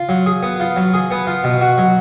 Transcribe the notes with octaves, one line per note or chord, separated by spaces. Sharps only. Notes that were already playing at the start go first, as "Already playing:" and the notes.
Already playing: F4
F#3
G#4
B3
F4
F#3
G#4
B3
F4
B2
F#4
F#3